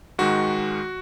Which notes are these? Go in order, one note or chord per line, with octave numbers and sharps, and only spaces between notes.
G#2 D#3 G#3 F#4